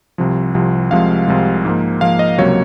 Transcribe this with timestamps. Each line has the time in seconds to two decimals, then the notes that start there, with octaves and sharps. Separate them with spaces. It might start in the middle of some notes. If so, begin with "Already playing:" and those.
0.18 C2 C3 F3
0.54 C2 C3 F3
0.91 C2 C3 F3 G#3 F5
1.28 C2 C3 F3 G#3
1.65 G#2 F3 A#3
2.01 G#2 F3 A#3 F5
2.19 D#5
2.38 C#2 C3 F#3 A#3 C#5